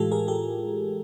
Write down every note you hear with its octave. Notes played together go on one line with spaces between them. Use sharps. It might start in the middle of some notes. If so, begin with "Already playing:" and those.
Already playing: A2 E3 G#3 F4 G4 A4
G#4 A#4
G4 A4